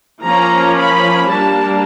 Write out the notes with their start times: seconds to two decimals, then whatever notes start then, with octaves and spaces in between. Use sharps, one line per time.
0.23 F3 A#3 C#4 A#5
0.76 B5
1.28 G3 A#3 D4 A5